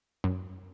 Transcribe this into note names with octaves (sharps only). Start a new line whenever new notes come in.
F#2